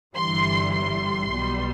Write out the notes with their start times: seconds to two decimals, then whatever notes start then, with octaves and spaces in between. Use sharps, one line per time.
0.15 G1 G2 E3 G3 C6
0.73 C6
1.30 B1 B2 G3